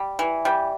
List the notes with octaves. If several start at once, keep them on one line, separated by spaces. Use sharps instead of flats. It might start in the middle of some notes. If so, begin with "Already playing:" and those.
Already playing: G3
E3
G3